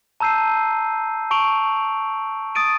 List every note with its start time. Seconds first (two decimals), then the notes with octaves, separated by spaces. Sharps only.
0.20 A5 A#5 E6 G6 C7 D#7
1.31 A5 C#6 D7 F7 F#7
2.55 D#6 A6 D7 D#7